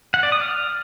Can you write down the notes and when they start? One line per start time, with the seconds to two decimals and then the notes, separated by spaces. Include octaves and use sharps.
0.14 F#5
0.23 D5
0.32 D#6
0.41 F6